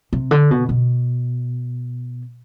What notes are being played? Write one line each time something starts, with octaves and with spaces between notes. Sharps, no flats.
C3
D3
B2
B2